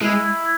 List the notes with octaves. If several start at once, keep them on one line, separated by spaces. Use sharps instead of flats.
G#3 E4